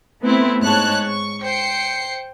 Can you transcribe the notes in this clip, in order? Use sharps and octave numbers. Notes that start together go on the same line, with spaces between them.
A3 B3 C4 E4
G#2 C#5 A5 F#6
C#6
C5 G5 C7 C#7